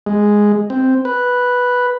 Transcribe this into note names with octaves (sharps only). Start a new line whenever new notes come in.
G#3
C4
B4